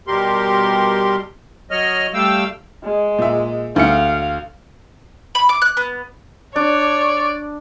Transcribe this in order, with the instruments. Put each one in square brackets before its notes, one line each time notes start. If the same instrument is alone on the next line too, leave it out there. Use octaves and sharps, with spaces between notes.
[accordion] B2 G3 G4 A#4 C6
F#3 C#5 D#5 F6
G3 A3 F5 G5 E6
[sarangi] G#3
[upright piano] A#2 E5
[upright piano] D2 E5 C#7 [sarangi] F5
[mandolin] B5
D6
F#6
B3
[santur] D4 [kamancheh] C#5 [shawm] D5